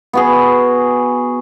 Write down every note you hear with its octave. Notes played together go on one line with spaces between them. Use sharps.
B3 F#4 G#4